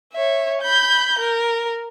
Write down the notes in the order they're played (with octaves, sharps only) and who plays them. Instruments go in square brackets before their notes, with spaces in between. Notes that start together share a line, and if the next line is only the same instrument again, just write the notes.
[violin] C#5 E5
B5 G6
A#4